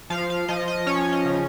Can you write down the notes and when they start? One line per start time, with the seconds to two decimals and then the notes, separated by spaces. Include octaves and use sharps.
0.10 F3 F5
0.30 F5
0.48 F3 D#5
0.68 D#5
0.87 C#4 C#5
1.13 D#5
1.25 C#3